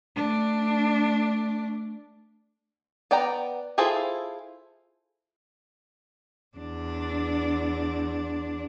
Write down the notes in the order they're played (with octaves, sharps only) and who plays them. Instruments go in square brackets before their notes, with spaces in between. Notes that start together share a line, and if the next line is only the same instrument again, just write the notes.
[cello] A3 D4
[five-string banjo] B3 D5 G5 A#5
E4 F4 G#4 A4 C5
[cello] E2 D4